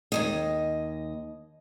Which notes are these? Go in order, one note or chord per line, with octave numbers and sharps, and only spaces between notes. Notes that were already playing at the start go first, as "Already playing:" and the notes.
D#2 A#2 D#5